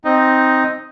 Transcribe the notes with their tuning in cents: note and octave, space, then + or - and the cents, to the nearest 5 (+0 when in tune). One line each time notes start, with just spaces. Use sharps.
C4 +0 D#4 +5 D#5 +0